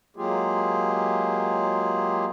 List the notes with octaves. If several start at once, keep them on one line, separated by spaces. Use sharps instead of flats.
F#3 G#3 A#3 F4 G4 G#4